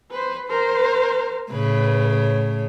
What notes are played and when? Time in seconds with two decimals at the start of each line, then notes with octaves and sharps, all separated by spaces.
0.11 B4 C5
0.48 A#4 C5
1.51 A2 C#3 B4